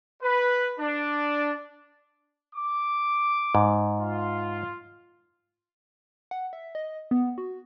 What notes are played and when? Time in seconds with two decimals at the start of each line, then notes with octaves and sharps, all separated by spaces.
0.23 B4
0.79 D4
2.56 D6
3.55 G#2
4.01 F4
6.31 F#5
6.53 E5
6.75 D#5
7.11 B3
7.38 F#4